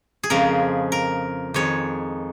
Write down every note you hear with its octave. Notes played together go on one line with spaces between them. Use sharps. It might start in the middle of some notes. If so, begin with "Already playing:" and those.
G#4
F2 C#3 F3 G#3 A#4
A#4
F2 D#3 G#3 C#5